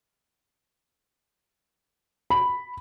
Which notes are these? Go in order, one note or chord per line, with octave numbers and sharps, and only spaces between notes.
B5